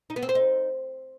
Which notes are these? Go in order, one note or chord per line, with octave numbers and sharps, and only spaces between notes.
D#4
B3
C4
C5
D#4